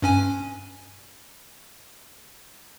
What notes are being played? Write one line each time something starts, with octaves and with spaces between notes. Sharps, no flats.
G2 C#4 G#5